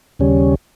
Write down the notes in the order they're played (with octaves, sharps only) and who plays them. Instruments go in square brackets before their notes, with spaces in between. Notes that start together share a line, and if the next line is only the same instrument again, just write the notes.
[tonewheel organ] D#2 C#3 G3 C#4